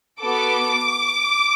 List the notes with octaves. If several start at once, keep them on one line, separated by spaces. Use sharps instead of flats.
B3 F#4 A4 D6